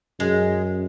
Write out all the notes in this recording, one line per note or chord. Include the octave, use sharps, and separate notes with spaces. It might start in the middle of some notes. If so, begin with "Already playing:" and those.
F#2 G#3